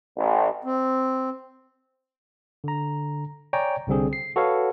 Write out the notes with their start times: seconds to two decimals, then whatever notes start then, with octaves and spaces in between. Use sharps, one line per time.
0.17 A1
0.65 C4
2.64 D3 A#5
3.53 C#5 D5 G5 G#5 A#5
3.87 C2 D3 G3 C4 G#4
4.13 C7
4.36 F#4 A4 B4 C#5 F5 F#5